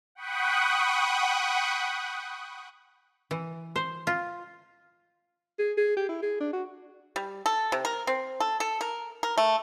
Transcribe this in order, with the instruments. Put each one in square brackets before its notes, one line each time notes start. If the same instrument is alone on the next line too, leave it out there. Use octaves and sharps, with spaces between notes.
[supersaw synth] F#5 G5 B5 C#6 D#6 F#6
[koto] E3
C5
F4
[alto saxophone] G#4
G#4
G4
E4
G#4
D4
F#4
[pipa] G3
A4
C3
A#4
C4
A4
A4
A#4
A#4
A3